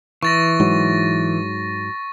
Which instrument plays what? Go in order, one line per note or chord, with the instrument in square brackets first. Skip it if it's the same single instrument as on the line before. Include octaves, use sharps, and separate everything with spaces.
[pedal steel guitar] E3 [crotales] C#6 A6 A#6
[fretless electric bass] G#2 F#3